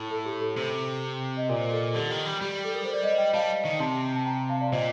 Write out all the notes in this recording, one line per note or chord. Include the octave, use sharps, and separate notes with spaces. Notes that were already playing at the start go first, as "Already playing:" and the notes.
Already playing: A2
A4
G4
A4
C3 C5
D#5
A#2 A#4 D5
C5
A4
A4
D3 G4
D#3
G3
G3 G4
A4
A#4
C5
D5
C5 D#5
D#5 G5
G3 F5 A5
D#3
C3 A5 C6
A5
G5 A#5
G5 A#5
F5 A5
D5 F5
A#2 C5 D#5